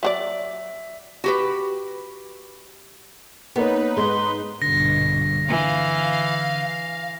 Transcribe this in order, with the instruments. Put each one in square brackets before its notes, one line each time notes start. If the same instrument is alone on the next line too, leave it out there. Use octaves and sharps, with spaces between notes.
[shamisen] F#3 F#4 D5 [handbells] E5
[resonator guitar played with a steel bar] F#4 G4 B4
[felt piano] A#3 A#4 C#5 [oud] B3 [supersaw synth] D#4 B4
[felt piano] G#2 G#4 [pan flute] C6
[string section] A#1 G2 B2 [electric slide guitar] D3 [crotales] A#6
[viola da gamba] E3 [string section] F5